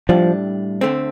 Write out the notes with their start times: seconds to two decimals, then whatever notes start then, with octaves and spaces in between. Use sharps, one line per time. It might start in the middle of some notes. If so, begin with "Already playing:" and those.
0.09 A2 F3 G3 D4
0.81 D2 D3 A3 C4